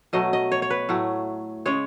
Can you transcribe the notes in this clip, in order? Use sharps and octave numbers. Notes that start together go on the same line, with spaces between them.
B2 F#3 A3 D#5
D#5
C#5
C#5
B4
A2 F#3 A3
C#3 G#3 C#5